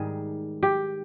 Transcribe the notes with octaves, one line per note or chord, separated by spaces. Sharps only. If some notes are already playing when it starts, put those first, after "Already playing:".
Already playing: G#2 D#3 G3 G#4
G4